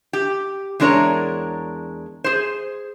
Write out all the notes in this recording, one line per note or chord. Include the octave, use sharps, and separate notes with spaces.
G4
E2 G#3 D4 A#4 C#5 A#5
G#4 C5